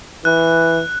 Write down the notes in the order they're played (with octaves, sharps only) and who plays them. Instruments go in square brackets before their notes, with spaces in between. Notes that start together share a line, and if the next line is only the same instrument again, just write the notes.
[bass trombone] E3 [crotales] F#6